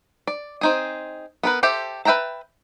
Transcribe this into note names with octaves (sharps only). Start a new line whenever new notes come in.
D5
C4 D#4 G#4
B3 A#4 B4
G4 A4 C5 E5
B4 E5 G5 A5 A#5